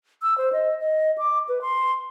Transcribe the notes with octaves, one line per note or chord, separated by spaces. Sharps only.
E6
C5
D#5
D#5
D6
B4
C6